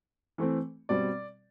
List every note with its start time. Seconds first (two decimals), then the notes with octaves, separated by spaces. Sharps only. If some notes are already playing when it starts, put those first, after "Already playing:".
0.38 E3 A3 C4
0.89 B2 G3 C4 D5